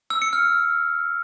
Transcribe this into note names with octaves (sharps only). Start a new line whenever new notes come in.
E6
C#7
F6